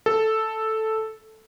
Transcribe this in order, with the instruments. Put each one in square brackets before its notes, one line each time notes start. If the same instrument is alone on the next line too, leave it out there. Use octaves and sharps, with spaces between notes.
[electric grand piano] A4